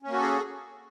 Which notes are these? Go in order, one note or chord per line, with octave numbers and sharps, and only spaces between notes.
A#3 C#4 F#4 G#4 A4